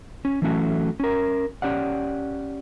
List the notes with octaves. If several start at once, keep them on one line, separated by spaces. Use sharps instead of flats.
C#4
E3 F#3 A3 C#4 F4 F#4
C#4 A#4
C#4 G4 D5 F#5